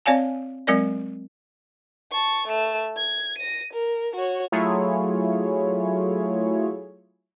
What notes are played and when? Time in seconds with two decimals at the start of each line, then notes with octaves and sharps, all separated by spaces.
0.06 C4 C#5 D5 F5 G#5 A5
0.67 F#3 G#3 C4 A#4 D5 D#5
2.12 A5 C#6
2.48 A3 E7
2.97 G#6
3.38 A#6 D#7
3.73 A#4
4.15 F#4 C#5
4.52 F#3 A3 E4 F4 G#4 C#5